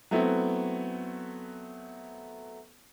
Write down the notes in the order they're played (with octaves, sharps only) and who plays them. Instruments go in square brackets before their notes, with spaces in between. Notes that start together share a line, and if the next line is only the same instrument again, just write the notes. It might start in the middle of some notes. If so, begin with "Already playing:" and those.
[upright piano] F#3 A3 B3 C4 E4